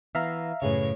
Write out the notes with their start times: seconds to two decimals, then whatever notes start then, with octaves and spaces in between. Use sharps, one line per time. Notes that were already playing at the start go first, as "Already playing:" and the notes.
0.15 E3 B3 E5 F5 A#5
0.62 F#2 A2 C#3 G#4 B4 C#5